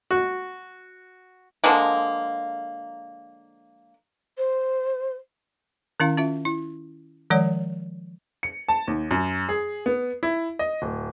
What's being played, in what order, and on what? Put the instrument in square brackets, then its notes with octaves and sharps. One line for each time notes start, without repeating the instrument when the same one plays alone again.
[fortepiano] F#4
[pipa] D3 F3 G#3 A#3
[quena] C5
[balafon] D#3 C#4 E4 F5
C#4 F4 E5
E4
D#3 F3 G#3 C#5 D5 F#5
[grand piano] C#7
A5
D#2
F#2
G#4
B3
E4
D#5
D1